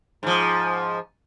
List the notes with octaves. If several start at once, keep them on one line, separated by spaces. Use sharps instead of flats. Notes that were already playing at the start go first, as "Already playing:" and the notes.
G#2 F3